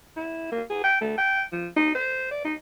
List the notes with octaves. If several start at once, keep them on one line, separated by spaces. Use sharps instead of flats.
E4
A#3
G#4
G5
A3
G5
F3
D#4
C5
D5
D#4